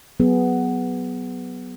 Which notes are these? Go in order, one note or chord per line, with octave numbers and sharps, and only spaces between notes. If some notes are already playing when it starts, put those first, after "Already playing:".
F#3 B3 G#4